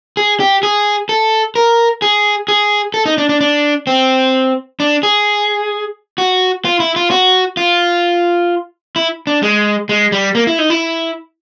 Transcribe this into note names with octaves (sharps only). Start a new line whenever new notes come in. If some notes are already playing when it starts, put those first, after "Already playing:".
G#4
G4
G#4
A4
A#4
G#4
G#4
A4
D#4
D4
D4
D4
C4
D4
G#4
F#4
F4
E4
F4
F#4
F4
E4
D4
G#3
G#3
G3
A#3
E4
D#4
E4